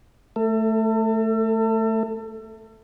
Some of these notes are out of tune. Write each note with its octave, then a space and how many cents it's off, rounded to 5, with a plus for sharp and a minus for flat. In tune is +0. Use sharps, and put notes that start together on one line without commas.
A3 +0 A4 +35